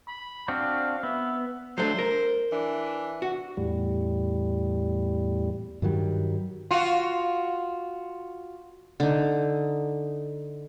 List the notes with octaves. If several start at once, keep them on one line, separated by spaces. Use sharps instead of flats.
B5
C4 D4 F#4 F5
B3 E5
F#3 A3 D4 C5
A#4
E3 D4
F#4
E2 A2 G3
G2 D#3 F#3 G3
F4 F#4
D3 D#4